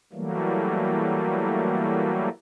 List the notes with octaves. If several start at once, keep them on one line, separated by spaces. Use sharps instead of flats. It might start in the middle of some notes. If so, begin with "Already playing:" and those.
E3 F#3 G3 A3 A#3